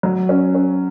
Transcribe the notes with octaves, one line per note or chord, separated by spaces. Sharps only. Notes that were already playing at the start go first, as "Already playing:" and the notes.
F#3
C#4
C#4